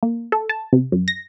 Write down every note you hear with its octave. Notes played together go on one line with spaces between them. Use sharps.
A#3
A4
A5
C3
F#2
A#6